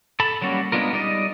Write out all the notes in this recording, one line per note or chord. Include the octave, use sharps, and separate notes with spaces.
A4 A5 B5
F#3 G3 A#3 C#4 F#4
G#3 B3 D4 F4 A#4
G3 D#4 D5 D#5